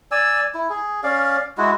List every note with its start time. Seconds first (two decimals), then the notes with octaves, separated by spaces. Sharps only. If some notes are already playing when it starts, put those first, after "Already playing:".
0.11 D5 G#5 E6
0.55 E4
0.70 G#4
1.04 C#4 D5 F5
1.58 G#3 E4 F#4